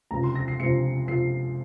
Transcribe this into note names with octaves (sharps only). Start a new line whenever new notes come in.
C#2 C3 F3 A#5
C6
A#6
C7
C#2 C3 F3 C#7
C3 F3 C7